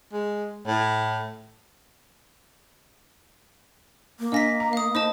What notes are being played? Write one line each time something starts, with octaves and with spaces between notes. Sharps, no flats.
G#3
A2
A#3
D4 D#5 F5 G#5 A#6 B6
A#5
F5 D#6
D#4 C5 D#5 A5